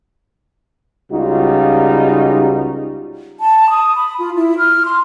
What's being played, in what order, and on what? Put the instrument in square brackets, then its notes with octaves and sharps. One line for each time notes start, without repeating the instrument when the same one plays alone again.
[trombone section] C#2 C#3 G3 D#4 F4 F#4
[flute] A5
D#6
B5
F4
E4
F6
C6